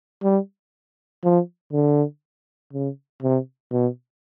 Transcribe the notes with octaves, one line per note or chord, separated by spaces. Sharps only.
G3
F3
D3
C#3
C3
B2